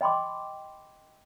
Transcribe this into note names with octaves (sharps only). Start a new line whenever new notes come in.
D#5 G5 B5 C6 D6